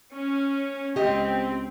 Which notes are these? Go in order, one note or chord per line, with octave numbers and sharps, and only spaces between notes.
C#4
C#2 C4 G4 D#5